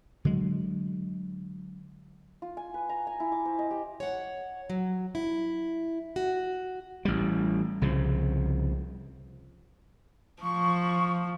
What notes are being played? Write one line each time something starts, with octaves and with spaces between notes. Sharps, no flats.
D3 F#3 G#3
F4
G#5
B4
A#5
G#5
E4
D6
C5
D#5
G4
C#5 F#5
F#3
E4
F#4
A1 G3
C2 C#3 F3
F3 C#6